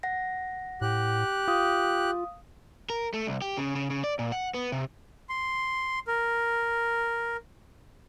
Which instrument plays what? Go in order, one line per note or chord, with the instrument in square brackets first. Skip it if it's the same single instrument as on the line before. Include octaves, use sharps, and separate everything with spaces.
[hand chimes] F#5 A#6
[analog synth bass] A2 [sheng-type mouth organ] G4 F#6
[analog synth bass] F4 [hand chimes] F5 D#6
[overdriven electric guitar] A#4
A3
C2
G4
C#3
C#3
C#3
D5
A#2
F#5
B3
C3
[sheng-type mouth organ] C6
A#4